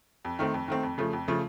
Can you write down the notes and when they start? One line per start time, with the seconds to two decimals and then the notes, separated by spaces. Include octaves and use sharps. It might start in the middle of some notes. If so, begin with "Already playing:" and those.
0.25 F2
0.39 D#3 A3 C4
0.54 F2
0.68 D#3 A3 C4
0.83 F2
0.98 C#3 F3 A3
1.13 F2
1.28 C#3 F3 A3